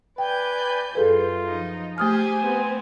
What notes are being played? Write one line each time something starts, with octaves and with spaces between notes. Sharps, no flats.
B4 D5 G5 G#5 G6
F#2 F4 G#4 A4 B4
F3 D#4
A3 G4 G#4 C5 G#5 D#6 F6
B3 C4